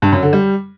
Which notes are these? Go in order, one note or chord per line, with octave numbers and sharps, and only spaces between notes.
G2
F#2
D3
G3